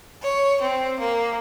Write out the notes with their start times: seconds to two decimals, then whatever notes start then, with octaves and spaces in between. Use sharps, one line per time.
0.22 C#5
0.62 C4
0.99 A#3